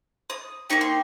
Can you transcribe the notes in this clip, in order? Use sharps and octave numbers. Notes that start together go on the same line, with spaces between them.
D#6
A#3 D#4 G4 C#6
C6